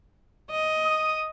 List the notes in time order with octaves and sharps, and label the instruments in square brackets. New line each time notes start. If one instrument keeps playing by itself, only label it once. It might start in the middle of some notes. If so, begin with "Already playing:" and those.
[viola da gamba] D#5
[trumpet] D#6